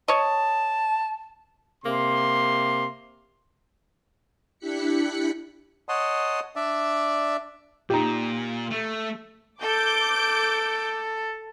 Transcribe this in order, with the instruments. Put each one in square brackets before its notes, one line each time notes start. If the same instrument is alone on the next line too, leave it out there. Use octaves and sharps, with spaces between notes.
[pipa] C#5 D#5 [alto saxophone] A5
[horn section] C3 A#3 C6
[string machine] D4 E4 G4 F#6 B6 C#7
[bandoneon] C#5 D#5 F#5 A5 C6 D#6
D4 D5 E5
[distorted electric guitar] A#2 [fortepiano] D#4 G4
[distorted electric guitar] A3
[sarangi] A4 [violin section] D6 G6 D7